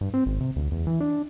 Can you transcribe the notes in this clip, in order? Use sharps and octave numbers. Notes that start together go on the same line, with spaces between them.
G2
C4
G#1
C3
D2
E2
E3
D4